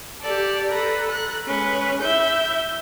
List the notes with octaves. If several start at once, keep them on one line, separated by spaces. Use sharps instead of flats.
G4 A4 D5
A4 B4 A#5
F#6
G#3 C#4 B4
E4 E5 G6